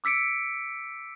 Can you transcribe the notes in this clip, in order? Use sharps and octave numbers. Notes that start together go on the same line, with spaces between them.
D6 E6 B6 C#7 D7